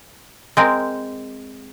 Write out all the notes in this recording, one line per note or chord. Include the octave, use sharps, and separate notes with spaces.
G#3 C4 A#4